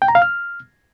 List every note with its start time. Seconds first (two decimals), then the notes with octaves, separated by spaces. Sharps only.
0.02 G5
0.08 A#5
0.15 F5
0.22 F6